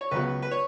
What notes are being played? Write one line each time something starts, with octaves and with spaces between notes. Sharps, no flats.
C#5
C#2 C#3 F#3 B3 B4
B4
C#5